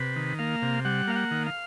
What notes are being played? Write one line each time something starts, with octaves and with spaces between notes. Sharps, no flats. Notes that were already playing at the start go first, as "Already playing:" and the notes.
Already playing: C3 B4
D#3
A#3 F5
C3
G3 F#5
A#3 F5
F#5
D#3
F5